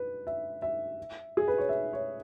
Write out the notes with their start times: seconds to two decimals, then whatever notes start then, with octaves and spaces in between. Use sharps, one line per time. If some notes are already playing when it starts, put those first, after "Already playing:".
Already playing: B4
0.27 E5
0.62 E5
1.37 G#4
1.48 B4
1.58 C#5
1.69 E5
1.93 C#5